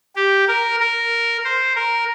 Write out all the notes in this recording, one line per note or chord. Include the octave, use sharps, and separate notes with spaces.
G4
A#4
A#4
C5
A#4